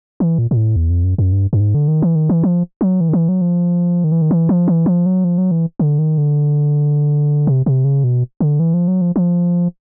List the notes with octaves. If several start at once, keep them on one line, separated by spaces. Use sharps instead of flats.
E3
A#2
A#2
A2
E2
F2
F#2
F#2
G2
G2
G#2
D3
D#3
E3
D#3
E3
F3
F#3
E3
D#3
E3
F#3
F3
D#3
E3
D#3
E3
F3
E3
F3
F#3
F3
F#3
E3
D3
D#3
D3
C3
C3
C#3
B2
D3
E3
F3
F#3
F3
F3